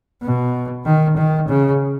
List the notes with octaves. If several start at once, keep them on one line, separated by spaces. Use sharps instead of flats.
B2
D#3
D#3
C#3